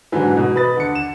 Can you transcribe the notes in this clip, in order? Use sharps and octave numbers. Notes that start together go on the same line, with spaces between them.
G#2 D3 E3 F#3
B2
B4 D#6 A6
D3 C#7
E7